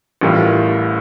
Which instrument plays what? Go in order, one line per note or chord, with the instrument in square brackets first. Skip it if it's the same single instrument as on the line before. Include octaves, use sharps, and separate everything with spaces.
[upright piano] A1 A2 G3 A#3 F4